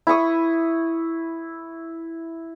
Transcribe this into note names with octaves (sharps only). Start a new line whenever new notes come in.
E4 B5 C#6 D#6